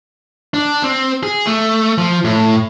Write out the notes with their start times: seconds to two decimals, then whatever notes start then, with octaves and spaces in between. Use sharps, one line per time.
0.54 D4
0.83 C4
1.23 G#4
1.47 A3
1.98 F3
2.24 A2